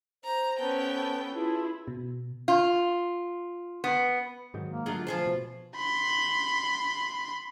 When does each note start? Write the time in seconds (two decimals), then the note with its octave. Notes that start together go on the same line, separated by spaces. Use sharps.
0.24 C5 A#5
0.59 B3 C#4 A4 B4 G5
1.35 E4 F4 G#4
1.88 B2
2.48 F4
3.84 B3
4.54 G#2 D#3 F#3
4.69 A#3
4.86 D3 F#3 A3 F4 G#4
5.07 F3 F4 G#4 C5
5.26 B2
5.76 B5 C6